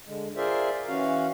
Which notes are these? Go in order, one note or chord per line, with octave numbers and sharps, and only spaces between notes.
D3 G#3
F4 G#4 A#4 C5 D5 E5
E3 C#4 F#4 F5